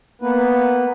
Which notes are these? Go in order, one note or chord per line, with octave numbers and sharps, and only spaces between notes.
A#3 B3 B4